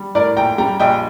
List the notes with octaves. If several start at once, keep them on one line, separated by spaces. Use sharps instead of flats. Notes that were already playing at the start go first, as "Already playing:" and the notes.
Already playing: G3
A2 A#4 D5
A#1 G5 A#5
G3 G5 A#5
A#1 D#5 G5